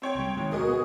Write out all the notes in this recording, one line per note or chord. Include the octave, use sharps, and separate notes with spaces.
C4 C#5 G5
C2 G3
G#2 D#3
G#1 D2 B2 F#4 G#4 A#4 D#5 D#6
B3